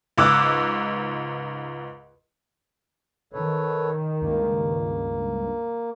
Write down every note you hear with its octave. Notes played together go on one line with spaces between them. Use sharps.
C#2 G#2 D6 E6 F#6
D#3 A4 B4 C#5
C#2 G2 A#3